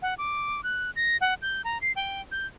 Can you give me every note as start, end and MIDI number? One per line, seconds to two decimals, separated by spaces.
0.02 0.14 78
0.18 0.61 86
0.64 0.91 90
0.96 1.17 94
1.21 1.34 78
1.42 1.62 91
1.64 1.80 82
1.81 1.92 96
1.96 2.22 79
2.32 2.47 91